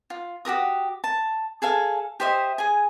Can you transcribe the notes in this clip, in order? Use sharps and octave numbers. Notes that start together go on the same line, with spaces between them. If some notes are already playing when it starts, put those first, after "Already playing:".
F4
F#4 G4 A#4 D#6
A5
G#4 A4 F5 G#5
G4 C5 D#5 E5
G#4 G#5